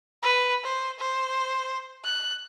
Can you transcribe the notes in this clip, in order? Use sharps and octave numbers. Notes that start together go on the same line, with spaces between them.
B4
C5
C5
F#6